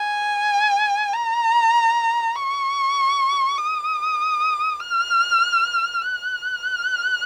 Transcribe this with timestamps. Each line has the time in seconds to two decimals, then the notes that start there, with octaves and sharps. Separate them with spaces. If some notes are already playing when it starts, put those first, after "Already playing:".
Already playing: G#5
1.14 A#5
2.36 C#6
3.58 D#6
4.80 F6
6.02 F#6